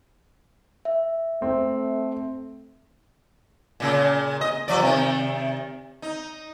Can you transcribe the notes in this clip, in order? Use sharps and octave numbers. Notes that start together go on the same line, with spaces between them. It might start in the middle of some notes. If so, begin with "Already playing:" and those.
E5
A3 C4
A#2 C#3
D#5
G2 F3 D5
C3 D#3
D#4